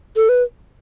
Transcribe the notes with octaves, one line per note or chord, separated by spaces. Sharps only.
A4
B4